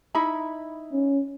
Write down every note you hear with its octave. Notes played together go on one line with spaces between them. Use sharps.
D#4 E4 B5
C#4